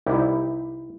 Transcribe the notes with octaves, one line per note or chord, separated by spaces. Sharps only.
C2 D#4 E4 G4